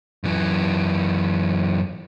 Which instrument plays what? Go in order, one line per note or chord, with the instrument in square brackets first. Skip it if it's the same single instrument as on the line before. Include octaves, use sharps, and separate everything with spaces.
[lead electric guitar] F#2 E3